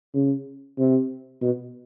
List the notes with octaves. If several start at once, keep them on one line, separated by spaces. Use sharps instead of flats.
C#3
C3
B2